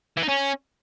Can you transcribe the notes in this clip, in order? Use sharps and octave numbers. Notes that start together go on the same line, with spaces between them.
E3
D#4
C#4